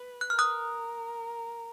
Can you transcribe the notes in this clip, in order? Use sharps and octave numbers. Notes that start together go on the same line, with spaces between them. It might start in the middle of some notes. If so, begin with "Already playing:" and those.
Already playing: B4
F#6
F6
A#4 D#6 F#6